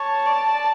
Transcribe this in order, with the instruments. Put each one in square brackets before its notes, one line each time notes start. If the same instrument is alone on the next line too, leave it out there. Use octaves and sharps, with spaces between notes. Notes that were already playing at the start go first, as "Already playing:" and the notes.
Already playing: [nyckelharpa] C#5 [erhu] A5
[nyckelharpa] D5